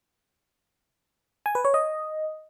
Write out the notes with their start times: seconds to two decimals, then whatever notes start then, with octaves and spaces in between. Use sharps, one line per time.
1.46 G#5
1.55 B4
1.65 C#5
1.74 D#5